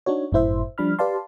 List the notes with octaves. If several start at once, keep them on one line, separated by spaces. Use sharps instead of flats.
D4 D#4 F#4 C#5
G1 F#2 A2 E4 C5 E5
F3 G3 D4 B5 F6
G4 B4 D5 F5 A5 C6